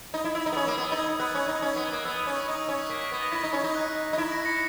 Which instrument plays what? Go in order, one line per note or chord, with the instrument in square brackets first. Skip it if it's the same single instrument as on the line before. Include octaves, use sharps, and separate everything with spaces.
[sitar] D#4
E4
[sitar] E4 [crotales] E6
[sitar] D#4
B3
[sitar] C#4 [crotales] E6
[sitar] A#3
[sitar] B3 [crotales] E6
[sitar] D#4
[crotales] G#6
[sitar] B3 [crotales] F#6
[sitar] C#4
D#4
C#4
B3
A#3
[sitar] B3 [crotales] E6
[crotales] E6
[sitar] C#4
[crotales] C#6
[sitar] D#4 [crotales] D#6
[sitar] C#4
[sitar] A#3 [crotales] B6
[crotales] B6
[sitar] B3
[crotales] A#6
[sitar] E4 [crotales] G#6
[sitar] D#4
C#4
D#4
[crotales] F#6
[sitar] D#4
E4
[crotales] A#6
A#6 C#7